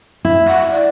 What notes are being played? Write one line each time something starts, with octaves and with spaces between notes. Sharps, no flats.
E4
F#5
D5